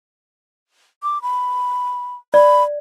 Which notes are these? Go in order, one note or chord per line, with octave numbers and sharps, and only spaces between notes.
D6
B5
D5 B5